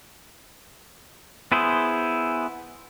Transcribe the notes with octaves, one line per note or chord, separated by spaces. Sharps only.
B3 E4 G#4 C5